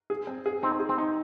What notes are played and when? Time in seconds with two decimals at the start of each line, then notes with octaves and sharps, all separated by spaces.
0.10 G#4
0.27 C4
0.46 G#4
0.63 C4 D#4
0.80 G#4
0.89 C4
0.98 D#4